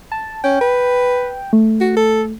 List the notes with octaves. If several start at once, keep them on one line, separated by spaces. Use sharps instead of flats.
A5
C#4 G5
B4
A3
F#4
A4